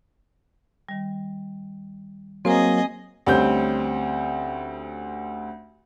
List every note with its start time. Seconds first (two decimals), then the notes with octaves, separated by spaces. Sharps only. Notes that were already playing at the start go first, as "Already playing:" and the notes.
0.89 D#3 G3
2.45 F#3 A#3 C4 G#4 C5 D#5 A#5
3.26 D2 G3 C4 C#4 G6